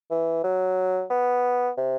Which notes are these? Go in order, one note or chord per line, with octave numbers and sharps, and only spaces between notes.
E3
F#3
B3
C3